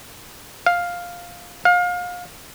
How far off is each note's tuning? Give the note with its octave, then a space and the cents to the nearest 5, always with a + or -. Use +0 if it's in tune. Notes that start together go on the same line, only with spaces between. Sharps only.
F5 +5
F5 +30